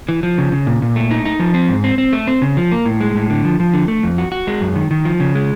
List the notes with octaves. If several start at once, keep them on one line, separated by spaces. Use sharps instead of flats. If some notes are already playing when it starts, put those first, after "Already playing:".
E3
F3
C#3
C#3
A#2
A#2
A3
D#4
D#4
F3
C4
G#2
C4
C4
A3
C4
C#3
F3
A#3
A2
G#3
A2
D3
F3
F3
D3
A3
F2
F#4
F#4
G#3
F#2
D#3
D#3
F3
C#3
G#3